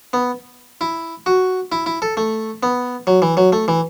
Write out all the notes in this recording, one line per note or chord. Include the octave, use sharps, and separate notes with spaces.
B3
E4
F#4
E4
E4
A4
A3
B3
F#3
E3
F#3
A3
E3